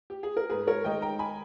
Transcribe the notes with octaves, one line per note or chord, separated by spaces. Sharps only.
G4
G#4
A#4
G#2 G#4 B4
A#4 C#5
D#3 G#3 D#4 D#5 G5
G5 A#5
G#5 B5